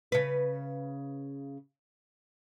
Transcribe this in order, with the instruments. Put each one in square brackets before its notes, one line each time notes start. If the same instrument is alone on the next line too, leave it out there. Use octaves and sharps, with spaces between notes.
[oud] C#3 B4